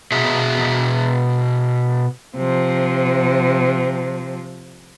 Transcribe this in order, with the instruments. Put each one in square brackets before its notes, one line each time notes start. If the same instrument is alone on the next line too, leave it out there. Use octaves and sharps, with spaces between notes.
[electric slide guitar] B2 F#4 G#4 E5
[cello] C3 F3